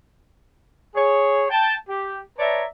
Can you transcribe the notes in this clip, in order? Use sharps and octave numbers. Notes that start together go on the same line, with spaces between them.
G#4 C#5
G5 A5
G4
B4 C#5 D5 E5 A5 A#5